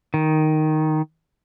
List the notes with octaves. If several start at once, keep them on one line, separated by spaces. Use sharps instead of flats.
D#3